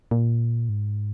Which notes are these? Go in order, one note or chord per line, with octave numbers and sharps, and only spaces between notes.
A#2
G#2